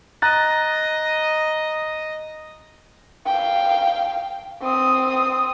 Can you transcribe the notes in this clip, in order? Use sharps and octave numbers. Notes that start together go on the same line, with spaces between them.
D#5 A#5 F#6 A6
F5 G5
C4 D#6